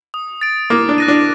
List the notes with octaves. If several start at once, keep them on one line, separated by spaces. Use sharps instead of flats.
D#6
A6 D7
A#3 D6
D4
F#6 A#6 D#7
D4